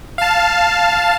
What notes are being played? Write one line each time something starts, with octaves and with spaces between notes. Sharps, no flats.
F5 A5